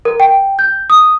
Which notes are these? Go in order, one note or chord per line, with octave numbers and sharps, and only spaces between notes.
A#4
G5
G6
D#6